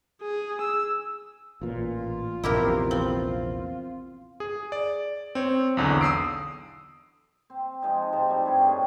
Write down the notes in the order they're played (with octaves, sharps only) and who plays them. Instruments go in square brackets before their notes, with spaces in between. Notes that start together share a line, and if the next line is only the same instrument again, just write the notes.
[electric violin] G#4
E6
[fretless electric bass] A1 A#2 [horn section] F4
[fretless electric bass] A#1 E2 C3 [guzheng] E4 G4 A#4
[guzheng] C4
[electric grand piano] G#4
D5
C4 C#5
B1 E2 D3
D#6 E6 C7 D7
[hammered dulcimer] C4
F3 G#3 C4 D#4
G#2 C3 A5 A#5
G3 A3 C4
G2 G4 G#4 C#6
A2 D#5